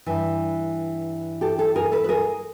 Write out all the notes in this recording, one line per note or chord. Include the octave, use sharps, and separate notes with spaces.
G2 E3
G4 A4
G4 A4
G#4 A#4
A4 B4
B4
G#4 A#4